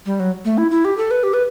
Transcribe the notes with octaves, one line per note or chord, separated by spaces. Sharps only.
G3
F#3
A3
E4
E4
G4
A4
B4
G4
B4